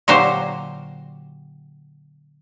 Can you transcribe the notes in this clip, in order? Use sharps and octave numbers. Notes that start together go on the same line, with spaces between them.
A#2 D3 F#3 G4 C5